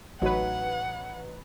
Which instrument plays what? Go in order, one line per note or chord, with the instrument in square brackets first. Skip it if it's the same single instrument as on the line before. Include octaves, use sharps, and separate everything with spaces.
[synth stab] A1 B4 [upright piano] F#3 D#4 C#5 [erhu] F#5